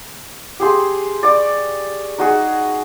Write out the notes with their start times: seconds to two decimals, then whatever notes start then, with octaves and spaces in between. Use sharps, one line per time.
0.60 G4 G#4 C6
1.23 D5 C#6
2.18 D#4 F#4 G#4